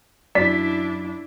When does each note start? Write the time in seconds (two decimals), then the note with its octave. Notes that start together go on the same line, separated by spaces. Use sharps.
0.35 F#2 D4 E4 D5 B6